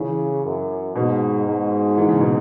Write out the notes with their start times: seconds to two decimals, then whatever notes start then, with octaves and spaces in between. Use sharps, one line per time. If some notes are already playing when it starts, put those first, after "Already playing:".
Already playing: C#3 E3
0.44 F#2
0.95 G#2 B2
1.46 G#2
1.98 E3
2.09 C#3
2.21 B2